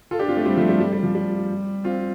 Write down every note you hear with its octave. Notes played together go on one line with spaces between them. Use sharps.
F4 A4
D4 G4
C4 F4
A3 D4
G3 C4
F3 A3
G3
G3
G3
F3
G3
C4 F4